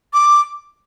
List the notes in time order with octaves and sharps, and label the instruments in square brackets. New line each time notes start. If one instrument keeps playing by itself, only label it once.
[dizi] D6